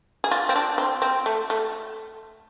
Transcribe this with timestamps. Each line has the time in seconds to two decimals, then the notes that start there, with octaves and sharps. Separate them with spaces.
0.24 G#4
0.31 F4
0.49 C4
0.55 D4
0.78 C4
1.02 C4
1.26 A3
1.50 A3